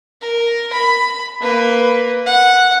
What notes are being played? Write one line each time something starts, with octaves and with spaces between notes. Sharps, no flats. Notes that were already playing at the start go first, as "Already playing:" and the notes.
A#4
B5
A#3 B4
F#5